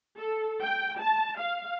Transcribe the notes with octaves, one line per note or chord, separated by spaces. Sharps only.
A4
G5
A5
F5